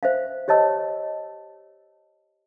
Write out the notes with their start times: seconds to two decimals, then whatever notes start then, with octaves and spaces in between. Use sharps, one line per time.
0.03 C5 E5 F5
0.48 G4 C#5 D#5 A5 E6